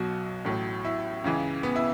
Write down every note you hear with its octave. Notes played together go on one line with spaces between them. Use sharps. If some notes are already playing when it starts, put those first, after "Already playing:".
Already playing: B1 B2 F#3 F#4
A1 A2 F#3
E4
C#2 C#3 E3
B3
E4